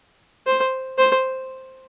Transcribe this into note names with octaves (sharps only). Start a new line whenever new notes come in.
C5
C5